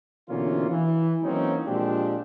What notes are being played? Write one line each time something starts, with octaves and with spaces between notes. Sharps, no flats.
B2 D3 E3 A#3 C#4 F4
E3
E3 F#3 A#3 C4 C#4 D#4
A#2 F3 G#3 C4 D4 G4